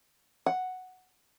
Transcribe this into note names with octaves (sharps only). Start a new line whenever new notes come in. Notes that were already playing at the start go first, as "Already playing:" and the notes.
F#5